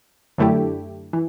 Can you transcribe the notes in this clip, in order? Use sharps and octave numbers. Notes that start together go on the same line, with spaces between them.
F#2 D3 A3 E4 G4
E3